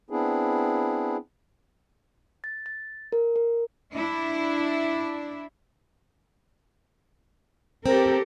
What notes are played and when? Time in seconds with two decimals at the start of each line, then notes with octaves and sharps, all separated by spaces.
0.10 B3 C4 D4 E4 G#4
2.44 A6
2.66 A6
3.12 A#4
3.36 A#4
3.95 D4 E4
7.86 C4 G4 A4 A#4